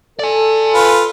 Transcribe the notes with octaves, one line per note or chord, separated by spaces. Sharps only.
A4 D5 G#5
F4 B4